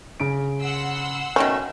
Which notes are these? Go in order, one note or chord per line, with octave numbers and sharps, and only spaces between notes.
C#3 C#4 D7
F#5 C6 E6
B2 D#3 A3 C#4